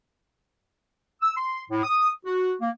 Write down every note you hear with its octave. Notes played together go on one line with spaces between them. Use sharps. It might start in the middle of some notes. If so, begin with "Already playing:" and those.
E6
C6
A2
D#6
F#4
A#3